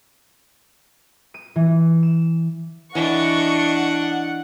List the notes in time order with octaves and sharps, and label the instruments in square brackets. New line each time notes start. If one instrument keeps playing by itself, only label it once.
[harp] D#7
E3
E7
[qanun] E3 [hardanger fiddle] D4 [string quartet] D#5 C#6 [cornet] F#5